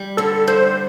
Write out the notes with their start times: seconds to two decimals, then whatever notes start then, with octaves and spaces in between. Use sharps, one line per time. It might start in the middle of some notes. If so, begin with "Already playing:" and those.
Already playing: G3
0.17 D3 A4
0.47 G2 C5